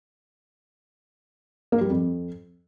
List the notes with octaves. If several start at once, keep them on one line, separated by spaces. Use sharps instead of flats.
A#3
G3
F2